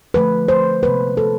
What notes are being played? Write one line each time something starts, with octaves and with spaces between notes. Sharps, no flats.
D3 F3 A3 B4
C5
C3 G#3 B3 B4
A4